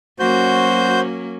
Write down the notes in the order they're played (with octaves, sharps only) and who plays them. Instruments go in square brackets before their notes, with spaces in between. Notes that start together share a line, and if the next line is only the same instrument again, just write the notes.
[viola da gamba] F#3 A#3 C#4 [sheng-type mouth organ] F#4 C5 G6